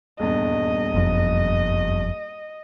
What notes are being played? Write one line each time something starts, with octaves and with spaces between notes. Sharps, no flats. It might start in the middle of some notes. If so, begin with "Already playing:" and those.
D#1 E2 G2 D#5
F#1 F2